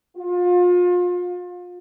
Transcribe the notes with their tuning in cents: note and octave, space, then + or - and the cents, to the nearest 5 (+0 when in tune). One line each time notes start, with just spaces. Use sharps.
F4 +30